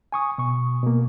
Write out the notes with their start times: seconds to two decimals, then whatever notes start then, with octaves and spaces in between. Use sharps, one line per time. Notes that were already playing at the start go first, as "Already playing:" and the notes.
0.12 G#5 C#6 D#6
0.38 B2 C#6
0.83 B2 A#3